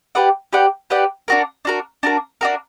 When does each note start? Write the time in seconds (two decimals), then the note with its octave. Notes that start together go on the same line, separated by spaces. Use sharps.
0.15 G4 B4 D5 F#5
0.53 G4 B4 D5 F#5
0.90 G4 B4 D5 F#5
1.28 D4 F#4 A#4
1.65 D4 F#4 A#4
2.03 D4 F#4 A#4
2.41 D4 F#4 A#4